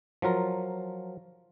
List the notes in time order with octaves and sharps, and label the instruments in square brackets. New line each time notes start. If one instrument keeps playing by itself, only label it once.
[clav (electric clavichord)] F3 F#3 F4 A#4